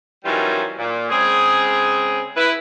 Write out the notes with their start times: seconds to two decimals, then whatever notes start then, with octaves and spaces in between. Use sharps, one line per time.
0.25 D#3 E3 F#3 G3 C#4 F4
0.78 A#2
1.10 C#3 G#3 C4 G#4
2.37 E4 B4